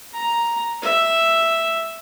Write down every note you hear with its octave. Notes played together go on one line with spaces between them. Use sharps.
A#5
E5